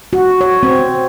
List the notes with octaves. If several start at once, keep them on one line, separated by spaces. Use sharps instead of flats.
F#4
C#5
C4